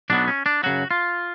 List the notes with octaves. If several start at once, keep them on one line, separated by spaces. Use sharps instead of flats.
B1 B2 F#3 B3 D4
C#4
D4
F#2 C#3 F#3 F#4
F4